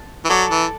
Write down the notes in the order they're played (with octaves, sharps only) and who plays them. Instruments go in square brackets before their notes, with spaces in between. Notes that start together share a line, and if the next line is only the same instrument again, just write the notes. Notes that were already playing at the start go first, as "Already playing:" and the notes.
Already playing: [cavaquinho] A5
[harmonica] E3
[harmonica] F#3 [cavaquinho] A4 D5 A5
[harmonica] E3